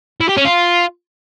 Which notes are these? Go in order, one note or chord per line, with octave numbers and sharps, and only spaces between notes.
E4
G4
C#4
F4